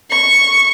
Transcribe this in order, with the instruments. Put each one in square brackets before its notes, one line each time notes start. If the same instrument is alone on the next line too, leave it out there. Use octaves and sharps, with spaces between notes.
[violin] C#6